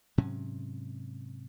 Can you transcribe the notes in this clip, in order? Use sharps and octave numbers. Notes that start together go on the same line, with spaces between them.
G#2 C3 F#3 C#4